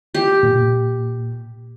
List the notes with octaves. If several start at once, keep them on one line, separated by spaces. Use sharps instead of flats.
G4
A#2